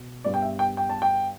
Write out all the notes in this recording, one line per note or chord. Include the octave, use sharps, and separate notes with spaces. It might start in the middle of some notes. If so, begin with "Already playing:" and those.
Already playing: B2
G2 G3 B3 D5
G5
E5
G5
G5
A5
G5